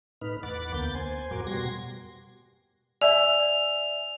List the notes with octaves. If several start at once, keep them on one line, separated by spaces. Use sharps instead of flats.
A2 D#4 B4 F6
E2 B4 F#5 D6 A6
D2 A#3 B3 G6 A6
C5 G#5
F2 A2 F#4 A#4 D6
B2 G3 F#4 C6 G#6 A#6
D5 E5 G#5 E6 F7